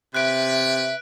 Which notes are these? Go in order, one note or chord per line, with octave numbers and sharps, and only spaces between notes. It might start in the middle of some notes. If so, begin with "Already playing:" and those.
C3 B4 E5 F#6 D7